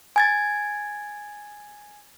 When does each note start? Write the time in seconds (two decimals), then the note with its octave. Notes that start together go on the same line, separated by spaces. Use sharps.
0.16 G#5 G#6 A6